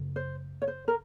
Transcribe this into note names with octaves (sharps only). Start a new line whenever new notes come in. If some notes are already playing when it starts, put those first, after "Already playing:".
Already playing: F#2 C#3 A3
C5
C#5
C5
A#4